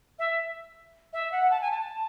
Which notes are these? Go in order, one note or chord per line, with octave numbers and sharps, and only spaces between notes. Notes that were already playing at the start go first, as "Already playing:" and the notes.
E5
E5
F#5
A5
G#5
A5